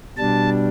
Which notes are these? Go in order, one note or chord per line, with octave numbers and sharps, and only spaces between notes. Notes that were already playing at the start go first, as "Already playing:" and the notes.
B2 G3 D4 A5